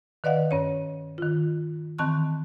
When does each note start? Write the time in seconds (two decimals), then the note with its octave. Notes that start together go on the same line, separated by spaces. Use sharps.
0.24 D#3 B4 D5 D#5 F5 F#5
0.51 G2 C#4 C#5
1.18 D#3 F4
1.99 D#3 E3 C4 A5 C#6 F#6